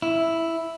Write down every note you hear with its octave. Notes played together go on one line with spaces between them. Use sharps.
E4